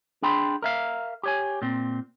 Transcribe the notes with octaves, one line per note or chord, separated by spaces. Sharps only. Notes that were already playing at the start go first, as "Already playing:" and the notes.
D4 G#4 G5 B5 C6
A#4 E5 F5
G4 C#5 G#5
A#2 C4